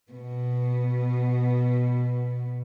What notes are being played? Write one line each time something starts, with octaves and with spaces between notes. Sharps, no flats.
B2 B3